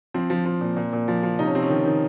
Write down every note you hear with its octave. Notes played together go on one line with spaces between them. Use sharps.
F3 C4
F3
F3
A#2
A#2
A#2
F3
F3
C3 D#4
C#4
C3 C4
C#4
D#3
D#3